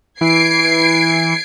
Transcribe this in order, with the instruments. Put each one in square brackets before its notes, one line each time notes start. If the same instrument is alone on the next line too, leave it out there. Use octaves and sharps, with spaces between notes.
[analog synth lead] E3 [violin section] G#6 C7 D7